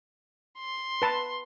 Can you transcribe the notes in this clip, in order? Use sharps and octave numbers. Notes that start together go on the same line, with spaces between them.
C6
B4 A5